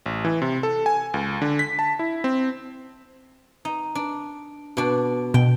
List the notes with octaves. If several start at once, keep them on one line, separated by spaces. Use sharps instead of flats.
A1
E3
C3
A4
G#5
C#2
D3
B6
A5
E4
C4
D#4
D4
B2 D4
B2 G5